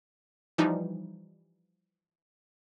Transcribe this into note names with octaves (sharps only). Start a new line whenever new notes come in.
E3 F3 G3 D#4